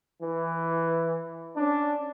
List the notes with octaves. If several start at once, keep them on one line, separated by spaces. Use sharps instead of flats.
E3
C#4 D4